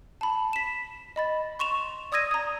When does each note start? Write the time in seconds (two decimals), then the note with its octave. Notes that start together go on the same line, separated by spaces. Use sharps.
0.21 A5 B5
0.53 B6 E7
1.16 D#5 B5 A6
1.59 C6 C#6 E7 F7
2.12 D5 D#6 E6 G#6 A#6 D#7
2.31 A#5 D#6